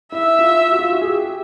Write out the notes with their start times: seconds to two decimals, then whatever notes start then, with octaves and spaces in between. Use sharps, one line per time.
0.12 E4 E5
0.39 F4
0.72 F#4
0.79 F4
0.92 F#4
1.01 G#4
1.05 G4